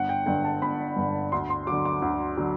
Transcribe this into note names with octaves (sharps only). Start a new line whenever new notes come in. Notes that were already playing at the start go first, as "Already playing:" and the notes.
Already playing: G1 F#5
G5
G2 D3 G5
A5
G1 B5
G2 D3
D2 C6
C6
D3 F#3 D6
D6
D2
D3 F#3